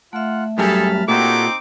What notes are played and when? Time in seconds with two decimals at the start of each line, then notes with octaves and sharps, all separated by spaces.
0.13 A3 F4 E5 F#5
0.58 F#2 G3 G#4 A4 A5 B5 F6
1.08 A#2 C4 D#4 F#4 G4 A4 D6